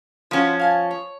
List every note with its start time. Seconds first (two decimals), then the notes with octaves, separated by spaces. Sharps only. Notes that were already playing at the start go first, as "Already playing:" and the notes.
0.31 F3 C#4 F4 F#4 F#5
0.59 F5 G#5 A5
0.91 C#5